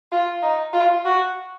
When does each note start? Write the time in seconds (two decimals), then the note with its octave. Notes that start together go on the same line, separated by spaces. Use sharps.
0.12 F4
0.43 D#4
0.73 F4
1.05 F#4